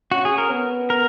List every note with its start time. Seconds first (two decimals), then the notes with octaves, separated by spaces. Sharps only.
0.12 C#4 F#4
0.25 G#4
0.38 A#4
0.51 B3
0.90 A#4